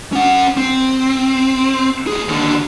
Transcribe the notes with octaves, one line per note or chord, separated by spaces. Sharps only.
C#4 F#5
C4
A2 G#4
D#2 D3